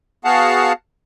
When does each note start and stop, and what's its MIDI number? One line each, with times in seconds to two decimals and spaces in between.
0.25 0.73 59
0.25 0.73 66
0.25 0.73 68
0.25 0.73 77
0.25 0.73 78
0.25 0.73 81